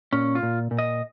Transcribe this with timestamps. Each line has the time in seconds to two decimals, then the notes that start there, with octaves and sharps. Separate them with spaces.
0.13 A#2 C#4
0.35 F4
0.43 A#2
0.71 A#2
0.79 D#5